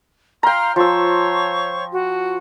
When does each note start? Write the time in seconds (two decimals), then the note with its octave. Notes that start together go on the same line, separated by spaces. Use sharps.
0.43 F5 G5 A#5 C6 F6
0.76 F3 C5 C#5 C#6 E6
1.94 F#4